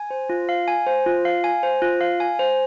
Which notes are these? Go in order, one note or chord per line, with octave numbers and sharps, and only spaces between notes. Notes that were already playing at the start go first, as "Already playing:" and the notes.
Already playing: G#5
C5
F4
F5
G#5
C5
F4
F5
G#5
C5
F4
F5
G#5
C5